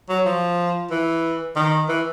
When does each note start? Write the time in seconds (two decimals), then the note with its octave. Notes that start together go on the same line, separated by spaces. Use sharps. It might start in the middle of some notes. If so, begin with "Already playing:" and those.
0.09 F#3
0.25 F3
0.91 E3
1.56 D#3
1.89 E3